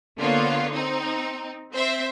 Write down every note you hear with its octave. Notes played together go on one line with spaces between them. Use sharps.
D3 A#3 B3 F4 C#5
C4 D#4
C4 C5 E5